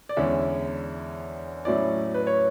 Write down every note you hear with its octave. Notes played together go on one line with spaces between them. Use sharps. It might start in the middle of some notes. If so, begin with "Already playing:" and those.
D5
E2 D3 G#3 C#4 E4 E5
A2 F#3 C#4 E4 D5
B4
C#5